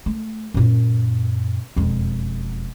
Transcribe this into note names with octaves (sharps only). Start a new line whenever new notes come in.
A3
F#2 A#2
E1 F2